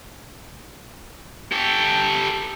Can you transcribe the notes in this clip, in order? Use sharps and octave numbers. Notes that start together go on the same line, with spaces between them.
G4 A4